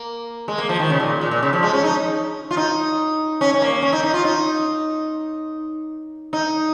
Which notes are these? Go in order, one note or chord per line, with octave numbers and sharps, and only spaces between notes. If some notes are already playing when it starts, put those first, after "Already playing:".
Already playing: A#3
G#3
A#3
F3
D#3
C#3
A#2
A#2
A#2
C#3
F3
G#3
C#4
D#4
F4
D#4
C#4
C#4
A#3
C#4
D#4
D#4
F4
D#4
D#4